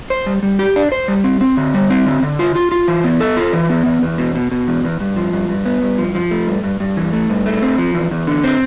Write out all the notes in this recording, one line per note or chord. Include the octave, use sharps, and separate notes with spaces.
C5
G3
G3
G4
D4
C5
G3
C4
C4
D3
G3
C4
D3
D3
F4
F4
F4
E3
B3
A4
F4
E3
B3
E2
E2
B2
B2
B2
E2
E2
G2
F3
G2
G2
B3
G2
F3
F3
A3
G2
G2
G2
E3
A3
G2
A3
C4
F3
E2
E2
D3
C4